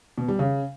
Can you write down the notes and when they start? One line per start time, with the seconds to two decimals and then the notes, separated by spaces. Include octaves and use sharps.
0.18 B2
0.28 G3
0.39 C#3